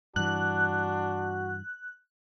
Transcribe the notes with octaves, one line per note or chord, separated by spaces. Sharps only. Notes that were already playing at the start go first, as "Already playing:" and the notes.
G2 E3 D4 F#4 F#6